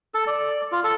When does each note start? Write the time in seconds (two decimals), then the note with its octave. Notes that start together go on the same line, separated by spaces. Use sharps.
0.14 A4
0.27 D5
0.72 F4
0.84 A4